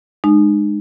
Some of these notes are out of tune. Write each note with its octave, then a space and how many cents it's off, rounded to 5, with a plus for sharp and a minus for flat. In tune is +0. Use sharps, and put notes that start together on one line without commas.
G#3 +0 D#4 -40